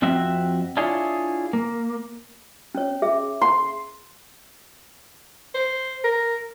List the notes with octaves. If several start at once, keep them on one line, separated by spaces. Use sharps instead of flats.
F2 C4 F#4 E5
D4 E4 F4 G#4 C#5
A#3
C#4 C#5
G#4 E5
C6
C5
A#4